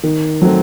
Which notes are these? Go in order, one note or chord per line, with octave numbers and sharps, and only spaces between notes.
D#3
F#3 A3 C4